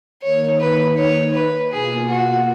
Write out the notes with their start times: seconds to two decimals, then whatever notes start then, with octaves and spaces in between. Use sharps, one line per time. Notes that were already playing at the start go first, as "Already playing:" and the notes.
0.23 D#3 A#3 D#4 C#5
0.60 B4
0.97 C#5
1.34 B4
1.72 B2 A#3 F4 G#4
2.09 F#4